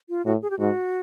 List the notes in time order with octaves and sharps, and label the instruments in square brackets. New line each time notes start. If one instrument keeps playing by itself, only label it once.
[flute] F4
[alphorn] A2 [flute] F#4
[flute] G#4
G4
[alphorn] G#2 [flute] F#4